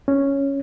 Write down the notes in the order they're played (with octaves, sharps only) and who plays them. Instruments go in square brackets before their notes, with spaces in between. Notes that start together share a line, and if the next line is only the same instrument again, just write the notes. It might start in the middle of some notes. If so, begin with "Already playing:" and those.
[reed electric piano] C#4